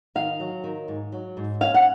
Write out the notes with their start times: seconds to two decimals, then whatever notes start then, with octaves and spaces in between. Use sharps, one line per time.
0.15 D#3 F5
0.40 F#3
0.64 D#3
0.88 G#2
1.12 F#3
1.37 G#2
1.61 C#4 F5
1.74 F#5